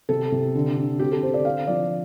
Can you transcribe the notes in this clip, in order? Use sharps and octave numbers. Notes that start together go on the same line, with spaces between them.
C3 A4
C3
D3
D3
C4 G4
A4
D3 C5
D5
C4 F5
F3 D5